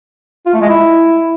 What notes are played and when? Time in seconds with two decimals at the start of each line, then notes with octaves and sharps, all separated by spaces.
0.46 F4
0.54 A3
0.61 G#3
0.69 E4